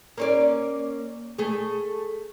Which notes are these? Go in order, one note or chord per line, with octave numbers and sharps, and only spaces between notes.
A#3 C#4 D5
A3 G#4